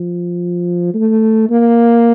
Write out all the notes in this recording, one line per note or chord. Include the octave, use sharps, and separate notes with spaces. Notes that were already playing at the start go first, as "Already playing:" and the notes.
Already playing: F3
A3
A#3